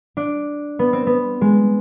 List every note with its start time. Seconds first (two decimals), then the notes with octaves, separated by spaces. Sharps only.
0.17 D4
0.79 B3
0.93 C4
1.07 B3
1.41 G#3